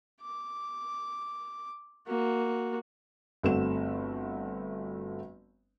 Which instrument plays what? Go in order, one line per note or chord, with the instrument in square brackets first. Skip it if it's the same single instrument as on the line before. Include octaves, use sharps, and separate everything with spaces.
[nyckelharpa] D6
A#3 F#4
[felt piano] G1 A3 C4 F#4 E7